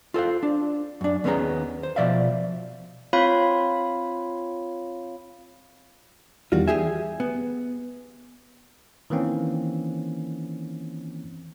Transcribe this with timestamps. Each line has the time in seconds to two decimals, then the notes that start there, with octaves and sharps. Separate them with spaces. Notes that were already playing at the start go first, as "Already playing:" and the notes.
0.14 F4 A4 C5 F5
0.43 D4
1.01 F#2 D4
1.24 D#2 A3 B3 C#4 G#4 A#5
1.83 C5
1.96 B2 F3 D5 E5 F5
3.13 C4 F4 C#5 F5 B5
6.52 E2 D#3 G3 F4 F#4
6.68 G4 G#4 E5 G#5
7.20 B3
9.10 D#3 E3 A#3 C4 C#4